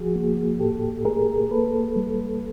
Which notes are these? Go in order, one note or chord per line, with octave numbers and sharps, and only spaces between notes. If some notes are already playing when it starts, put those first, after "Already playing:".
Already playing: F3 F#4 G#4
A#3
A2 G4 A4
A3 G#4 A#4
A#3 A4 B4
G3